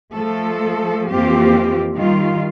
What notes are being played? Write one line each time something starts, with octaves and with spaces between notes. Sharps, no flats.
F3 A3 A4
F2 E3 A#3 C4 F4 G4
D#3 G3 F4